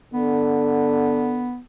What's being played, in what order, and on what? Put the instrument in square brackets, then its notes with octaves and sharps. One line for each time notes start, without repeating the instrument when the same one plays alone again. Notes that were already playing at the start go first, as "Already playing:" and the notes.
[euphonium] D3 [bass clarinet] B3